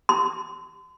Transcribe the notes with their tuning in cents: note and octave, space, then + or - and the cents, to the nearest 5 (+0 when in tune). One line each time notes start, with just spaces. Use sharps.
C6 -40